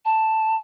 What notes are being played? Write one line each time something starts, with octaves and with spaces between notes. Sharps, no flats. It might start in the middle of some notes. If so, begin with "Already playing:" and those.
A5